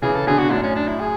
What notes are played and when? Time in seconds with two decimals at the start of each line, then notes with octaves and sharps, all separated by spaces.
0.02 C#3 E3 G#4
0.16 A4
0.27 B2 D3 G#4
0.39 F#4
0.51 F#2 A2 D4
0.63 C#4
0.76 D4
0.88 E4
1.00 G#4